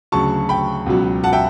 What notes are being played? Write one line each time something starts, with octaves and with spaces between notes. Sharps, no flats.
D2 C#3 F#3 A5 C#6
G5 B5
C#2 B2 F#3
F#5 A5
E5 G5